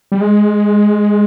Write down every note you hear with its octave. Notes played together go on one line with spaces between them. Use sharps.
G3
G#3